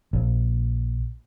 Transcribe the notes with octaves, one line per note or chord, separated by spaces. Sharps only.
A#1